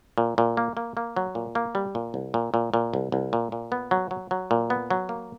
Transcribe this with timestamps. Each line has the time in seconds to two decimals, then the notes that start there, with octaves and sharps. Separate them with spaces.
0.18 A#2
0.38 A#2
0.57 A#3
0.77 A#3
0.97 A#3
1.16 F#3
1.35 A#2
1.55 A#3
1.75 G3
1.95 A#2
2.14 C2
2.34 A#2
2.54 A#2
2.74 A#2
2.94 C2
3.12 C2
3.33 A#2
3.52 A#2
3.72 B3
3.91 F#3
4.11 F#3
4.31 F#3
4.51 A#2
4.70 B3
4.90 F#3
5.09 A#3